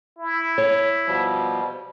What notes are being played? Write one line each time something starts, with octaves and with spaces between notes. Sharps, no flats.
E4
C#5
B2 F3 G3